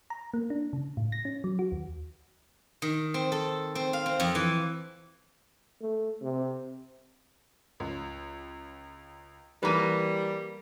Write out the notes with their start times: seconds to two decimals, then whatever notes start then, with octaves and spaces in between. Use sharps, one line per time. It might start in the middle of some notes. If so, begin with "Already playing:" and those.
0.10 A#5
0.34 A#3
0.50 D4
0.73 C#3
0.97 A2
1.12 A#6
1.25 C#4
1.44 F#3
1.59 F#4
1.72 D#2
2.82 D#3
3.14 C4
3.32 A4
3.75 C4
3.93 F5
4.06 C4
4.20 F2
4.35 E3
5.81 A3
6.22 C3
7.80 C#2
9.63 E3 G3 A#3 B4 A#5 D#7